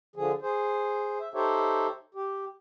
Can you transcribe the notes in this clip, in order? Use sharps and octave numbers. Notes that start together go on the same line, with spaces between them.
D3 F3 G#4
G#4 C5
E5
D#4 G4 A4 C5 C#5 E5
G4